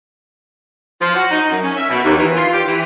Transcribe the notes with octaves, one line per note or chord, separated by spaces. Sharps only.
F3
F#4
D#4
F#2
C#4
E5
B2
D#2
E3
F4
G4
E3